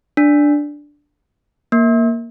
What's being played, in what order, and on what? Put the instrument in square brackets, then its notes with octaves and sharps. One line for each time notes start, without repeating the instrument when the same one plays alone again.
[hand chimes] D4
A#3